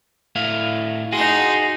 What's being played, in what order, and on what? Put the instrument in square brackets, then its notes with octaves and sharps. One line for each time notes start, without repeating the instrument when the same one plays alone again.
[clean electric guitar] A2 E4 F5
[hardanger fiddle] D#4 C6 [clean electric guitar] F#4 G#4